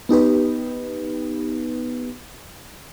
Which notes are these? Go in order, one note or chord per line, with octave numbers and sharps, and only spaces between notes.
B3 D#4 G4 B4